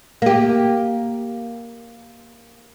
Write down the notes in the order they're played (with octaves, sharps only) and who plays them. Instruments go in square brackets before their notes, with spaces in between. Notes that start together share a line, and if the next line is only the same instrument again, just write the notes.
[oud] A#3 G4